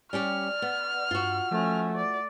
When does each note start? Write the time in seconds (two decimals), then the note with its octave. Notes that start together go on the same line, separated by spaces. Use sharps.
0.13 G3 C#4 G4 D5 F6
0.62 B3
1.11 G2 F4 F#4
1.51 F3 A3 C#4
1.97 D5